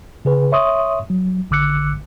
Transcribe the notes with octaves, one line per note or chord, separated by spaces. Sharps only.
C#3 G#4 B4
C#5 E5 C6 C#6 D#6
F#3
A1 D3 D6 E6 F#6 C#7